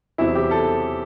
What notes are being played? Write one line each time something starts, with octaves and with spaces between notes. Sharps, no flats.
E2 C3 F#3 C4 E4
G4
A4